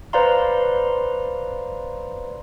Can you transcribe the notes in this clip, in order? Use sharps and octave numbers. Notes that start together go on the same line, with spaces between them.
B4 C5 D5 F5 A#5 C6